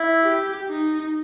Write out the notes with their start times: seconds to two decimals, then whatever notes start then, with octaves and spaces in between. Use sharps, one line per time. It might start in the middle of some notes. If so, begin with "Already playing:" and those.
Already playing: E4
0.23 G4
0.69 D#4